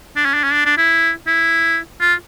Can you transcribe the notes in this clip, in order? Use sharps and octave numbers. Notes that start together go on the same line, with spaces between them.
D4
C#4
D4
C#4
D4
D4
E4
E4
F4